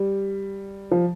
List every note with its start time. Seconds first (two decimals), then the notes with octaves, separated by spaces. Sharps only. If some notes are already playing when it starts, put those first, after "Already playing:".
Already playing: G3
0.91 F3